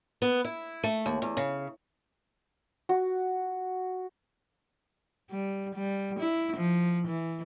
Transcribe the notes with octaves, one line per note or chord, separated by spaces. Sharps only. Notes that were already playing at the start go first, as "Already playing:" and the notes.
B3
E4
A3
D#2
E2
C#3
F#4
G3
G3
E4
F3
E3